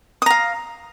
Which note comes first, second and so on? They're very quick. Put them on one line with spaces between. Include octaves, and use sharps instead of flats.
D#6 A#5 F5